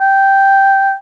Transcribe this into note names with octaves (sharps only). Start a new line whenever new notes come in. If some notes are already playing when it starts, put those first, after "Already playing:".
G5